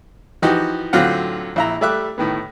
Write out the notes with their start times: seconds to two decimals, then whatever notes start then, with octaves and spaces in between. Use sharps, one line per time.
0.42 E3 F3 D#4 F#4 G4
0.93 A2 D3 F#3 C4 F4 F#5
1.56 A#1 E4 A#5
1.81 G3 A3 E5 D6 F#6
2.18 A2 D#3 B3